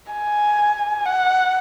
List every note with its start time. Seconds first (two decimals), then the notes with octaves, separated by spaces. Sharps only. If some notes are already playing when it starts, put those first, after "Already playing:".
0.12 G#5
1.06 F#5